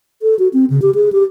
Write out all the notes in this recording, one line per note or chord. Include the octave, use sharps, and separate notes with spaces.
A4
F#4
C4
C#3
G4
G#4
G4